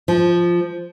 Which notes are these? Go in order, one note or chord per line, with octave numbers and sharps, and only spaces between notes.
F3